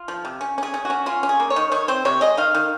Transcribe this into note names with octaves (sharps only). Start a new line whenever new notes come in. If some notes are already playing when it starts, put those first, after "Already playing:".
Already playing: F4
F3
C3
C#4
C#4 G#4
C#4
F#4
C#4
C#4 F4
C#4
G#4
A#3
C#5
D#3
D#3 C#5
C4 C5
C3 C#5
G#3 D#5
D#3 F5
D#3